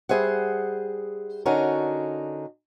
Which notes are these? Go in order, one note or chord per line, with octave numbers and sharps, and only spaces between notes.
G3 G#4 C5 E5 F#5
D3 C#4 D#4 F#4 A#4